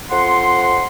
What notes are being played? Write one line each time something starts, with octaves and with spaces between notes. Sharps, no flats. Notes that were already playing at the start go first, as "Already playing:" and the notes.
F2 F#5 C6